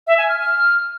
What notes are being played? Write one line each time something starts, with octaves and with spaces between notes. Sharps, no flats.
E5
G#5
F6
F6